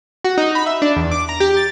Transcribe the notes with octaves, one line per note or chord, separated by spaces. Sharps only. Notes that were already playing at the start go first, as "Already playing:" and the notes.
F#4
D#4
B5
E5
D4
E2
D6
A#5
G4
A6